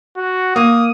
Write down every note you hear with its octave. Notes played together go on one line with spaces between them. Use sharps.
F#4
A#3 D#6